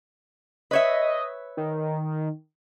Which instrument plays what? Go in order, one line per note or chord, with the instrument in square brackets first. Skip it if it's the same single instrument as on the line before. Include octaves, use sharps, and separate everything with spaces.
[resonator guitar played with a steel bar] B4 C#5 E5 [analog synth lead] D#5
[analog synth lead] D#3